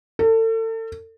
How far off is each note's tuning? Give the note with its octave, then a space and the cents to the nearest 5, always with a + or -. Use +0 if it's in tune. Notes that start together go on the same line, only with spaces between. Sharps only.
A4 +35